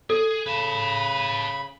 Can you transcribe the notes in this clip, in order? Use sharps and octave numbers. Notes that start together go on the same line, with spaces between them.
G#4 A4
C#3 B4 A5 B5